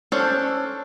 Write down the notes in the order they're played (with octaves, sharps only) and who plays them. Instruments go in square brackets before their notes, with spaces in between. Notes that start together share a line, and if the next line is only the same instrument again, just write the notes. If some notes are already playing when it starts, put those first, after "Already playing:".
[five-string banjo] C#4 D4 A4 C5